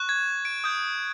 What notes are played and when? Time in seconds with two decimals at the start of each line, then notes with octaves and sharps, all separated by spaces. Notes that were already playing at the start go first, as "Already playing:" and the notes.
Already playing: C#6 F#6
0.09 G#6
0.45 D7
0.64 D#6 G6